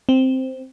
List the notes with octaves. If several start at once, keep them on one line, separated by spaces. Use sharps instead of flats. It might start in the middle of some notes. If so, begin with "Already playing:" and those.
C4